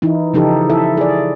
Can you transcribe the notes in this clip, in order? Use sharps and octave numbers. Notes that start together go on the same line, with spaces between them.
E3 D#4 E4
C#3 F3 D#4 G4 A4
E4 A4 E5
G#4 D5